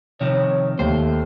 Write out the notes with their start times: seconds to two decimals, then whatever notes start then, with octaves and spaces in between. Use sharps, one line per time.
0.21 C3 D#3 F3 C#5
0.79 D#2 A3 C5